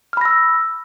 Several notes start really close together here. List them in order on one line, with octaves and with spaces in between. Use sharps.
F6 B5 A#6 E6